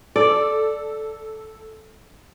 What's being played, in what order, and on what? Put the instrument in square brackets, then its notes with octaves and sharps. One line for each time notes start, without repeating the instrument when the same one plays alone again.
[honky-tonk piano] A4 [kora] D5